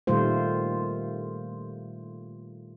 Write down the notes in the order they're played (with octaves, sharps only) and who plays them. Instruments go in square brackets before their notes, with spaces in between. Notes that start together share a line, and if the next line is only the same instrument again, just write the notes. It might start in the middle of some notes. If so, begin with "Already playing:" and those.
[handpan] A#2 D#3 G3 A3 F4 C5